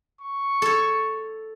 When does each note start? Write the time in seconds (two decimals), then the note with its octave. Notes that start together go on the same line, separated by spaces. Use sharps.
0.21 C#6
0.62 A4 C#5